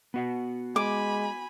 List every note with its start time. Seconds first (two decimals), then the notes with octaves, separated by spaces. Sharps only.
0.14 B3 F#4 F#5
0.76 G#3 G#5 B5 D6